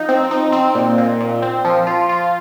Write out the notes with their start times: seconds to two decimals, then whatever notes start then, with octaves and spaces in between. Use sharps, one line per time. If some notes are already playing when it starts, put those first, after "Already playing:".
Already playing: F3 D#4
0.09 C4
0.31 D#4
0.52 C4
0.75 A#2
0.98 A#2
1.21 A#2
1.42 C4
1.65 F3
1.87 F4
2.09 F4